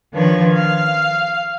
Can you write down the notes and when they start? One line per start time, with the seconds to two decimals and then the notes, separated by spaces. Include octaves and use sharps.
0.13 D#3 F3 D4 B4 C#5
0.52 F5